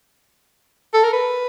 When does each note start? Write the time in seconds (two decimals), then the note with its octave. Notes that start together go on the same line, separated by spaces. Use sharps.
0.94 A4
1.03 A#4
1.13 B4